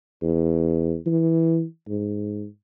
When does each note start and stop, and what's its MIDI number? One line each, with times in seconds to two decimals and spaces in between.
0.22 0.96 40
1.06 1.64 52
1.88 2.46 44